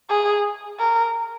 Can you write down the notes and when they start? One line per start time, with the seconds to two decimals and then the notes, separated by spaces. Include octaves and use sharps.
0.10 G#4
0.79 A#4